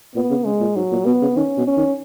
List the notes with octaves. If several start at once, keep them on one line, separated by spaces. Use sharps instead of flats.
A#2 B3
C#3
C#3 G#3
A#2
G#2 F#3
A#2
B2 B3
C#3
D#3 C#4
B2
C#4
D#3